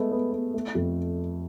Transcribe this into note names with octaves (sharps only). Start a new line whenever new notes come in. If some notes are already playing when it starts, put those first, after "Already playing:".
Already playing: G#3 A3 B3
B3
B3
A3
F2